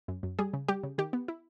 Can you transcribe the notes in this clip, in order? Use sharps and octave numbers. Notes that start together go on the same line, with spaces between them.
F#2
F#2
G3 G#4
C#3
G3 G4
C#3
D#3 G4
B3
E4